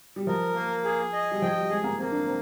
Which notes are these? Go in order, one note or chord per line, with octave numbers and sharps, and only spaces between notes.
G3
F3 A#4
A#3
G#4
D#5
G3
F3 G5
G3
G#3 G#4
A#3
A#3 C4
D4
C4